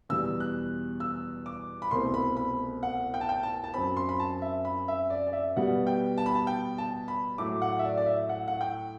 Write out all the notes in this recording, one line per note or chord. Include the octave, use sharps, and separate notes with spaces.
E2 B2 G3 E6
F#6
E6
D6
B5
C2 B2 A3 C4 C6
B5
B5
F#5
G5
A5
G5
A5
A5
F#2 F#3 C4 B5
C6
B5
A5
E5
B5
E5
D5
D5
E5
B2 G3 B3 F#5
G5
A5
B5
A5
G5
A5
B5
A2 F#3 A3 D6
F#5
E5
D5
D5
E5
F#5
F#5
G5